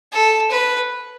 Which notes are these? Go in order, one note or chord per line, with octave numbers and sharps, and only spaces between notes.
A4
B4